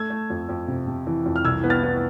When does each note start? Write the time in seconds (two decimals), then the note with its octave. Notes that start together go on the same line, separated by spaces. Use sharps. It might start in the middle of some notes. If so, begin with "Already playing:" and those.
Already playing: A3 E6 G#6
0.10 A3
0.30 F2
0.49 F2
0.68 C3
0.88 C3
1.07 E3
1.26 F2
1.36 F6
1.45 C2 E6 G#6
1.64 B3
1.70 F6 A6
1.83 B3